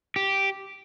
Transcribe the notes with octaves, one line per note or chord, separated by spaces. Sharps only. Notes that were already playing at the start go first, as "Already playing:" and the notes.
G4